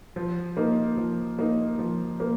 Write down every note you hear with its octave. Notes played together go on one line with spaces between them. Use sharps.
F3
A#3 D#4
F3
A#3 D#4
F3
A#3